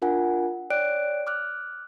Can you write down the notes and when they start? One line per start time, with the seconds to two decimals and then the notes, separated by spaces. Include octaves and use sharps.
0.02 D4 F4 A#4 F#5 G#5
0.70 C#5 D5 G5 F#6 D7
1.27 D6 F6 F#6